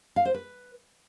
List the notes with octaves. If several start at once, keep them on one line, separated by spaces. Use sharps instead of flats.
F5
C5
B4